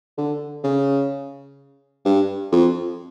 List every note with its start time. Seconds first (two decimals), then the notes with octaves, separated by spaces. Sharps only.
0.18 D3
0.64 C#3
2.05 G2
2.52 F2